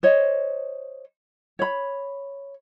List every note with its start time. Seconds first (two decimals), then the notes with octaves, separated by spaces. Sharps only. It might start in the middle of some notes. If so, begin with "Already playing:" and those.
0.03 C5 C#5 D#5
1.59 C#5 B5